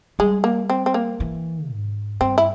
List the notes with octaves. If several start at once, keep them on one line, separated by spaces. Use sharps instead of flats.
G3 G#3
A#3
C4
C4
A#3
E3
G#2
G2 C4
E4